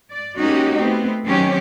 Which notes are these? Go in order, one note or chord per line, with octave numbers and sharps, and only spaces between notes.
D5
G#3 A#3 C#4 D#4 F#4 G4
A3 B3 C4
D#3 F#3 C4 C#4 G4